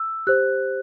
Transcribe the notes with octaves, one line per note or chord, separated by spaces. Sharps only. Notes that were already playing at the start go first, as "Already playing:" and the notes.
Already playing: E6
G4 C5 F#6